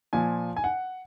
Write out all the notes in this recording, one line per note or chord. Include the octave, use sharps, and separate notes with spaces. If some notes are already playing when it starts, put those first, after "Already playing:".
A#2 F3 G#5
G#5
F#5